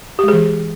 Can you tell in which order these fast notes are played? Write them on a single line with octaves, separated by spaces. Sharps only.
G4 G#3 G#4 E3